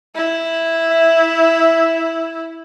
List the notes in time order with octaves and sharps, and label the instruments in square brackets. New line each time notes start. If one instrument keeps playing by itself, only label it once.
[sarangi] E4
[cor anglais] E5